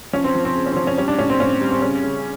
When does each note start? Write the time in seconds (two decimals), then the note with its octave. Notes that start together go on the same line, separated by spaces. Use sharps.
0.13 F3 C#4
0.24 C4
0.35 F3
0.45 C4
0.55 C#3
0.66 C#4
0.72 C4
0.77 F3 C#4
0.87 C#4
0.98 G3 C#4
1.08 D4
1.18 A2 C#4
1.30 C4
1.40 A2 C#4
1.61 G3
1.71 C4
1.82 C#3 C#4
2.03 C#3